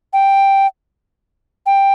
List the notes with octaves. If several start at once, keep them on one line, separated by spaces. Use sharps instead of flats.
G5
G5